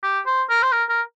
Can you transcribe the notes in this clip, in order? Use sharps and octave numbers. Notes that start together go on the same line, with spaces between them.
G4
C5
A#4
C5
A#4
A#4